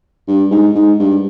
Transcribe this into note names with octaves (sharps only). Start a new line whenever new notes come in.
G2
G#2
G#2
G2